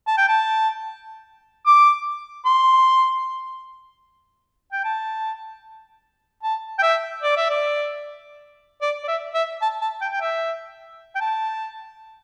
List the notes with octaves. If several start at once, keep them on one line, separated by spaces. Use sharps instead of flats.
A5
G5
A5
D6
C6
G5
A5
A5
G5
E5
D5
E5
D5
D5
D5
E5
E5
A5
A5
G5
G5
E5
G5
A5